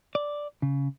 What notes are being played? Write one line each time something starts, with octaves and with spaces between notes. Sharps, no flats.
D5
C#3